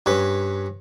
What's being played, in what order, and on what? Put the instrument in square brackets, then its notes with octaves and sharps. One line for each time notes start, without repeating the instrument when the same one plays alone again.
[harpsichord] G2 C#4 B4